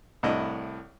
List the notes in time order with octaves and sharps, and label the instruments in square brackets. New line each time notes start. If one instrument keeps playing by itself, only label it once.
[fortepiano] C2 A2 D4 E4 D#5